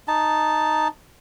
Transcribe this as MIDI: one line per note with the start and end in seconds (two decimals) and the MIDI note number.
0.08 0.88 63
0.08 0.88 81